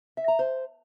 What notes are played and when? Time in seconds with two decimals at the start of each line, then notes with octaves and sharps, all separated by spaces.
0.17 E5
0.28 A#5
0.39 C5